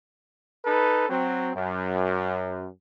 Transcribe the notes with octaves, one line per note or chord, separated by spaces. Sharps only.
D#4 A4 B4
F#3 C4
F#2